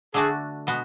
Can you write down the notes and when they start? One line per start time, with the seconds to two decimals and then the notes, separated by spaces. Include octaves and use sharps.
0.14 D3 A3 D4 F#4 G#4
0.67 B2 G#3 B3 F#4